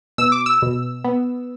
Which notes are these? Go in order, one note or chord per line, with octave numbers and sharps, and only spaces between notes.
B2 E6
D6
E6
B2
B3